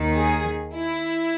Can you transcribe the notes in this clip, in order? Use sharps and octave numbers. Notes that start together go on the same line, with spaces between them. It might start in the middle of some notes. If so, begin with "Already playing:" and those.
Already playing: D#2 D#3
G#4
E4